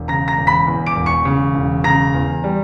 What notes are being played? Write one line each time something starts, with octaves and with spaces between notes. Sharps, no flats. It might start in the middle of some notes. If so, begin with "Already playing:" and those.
Already playing: E1
C#3 A#5 A#6
A#5 A#6
E1
B5 B6
E2
D6 D7
E1
C#6 C#7
C#3
E1
C#3 A#5 A#6
E2
G3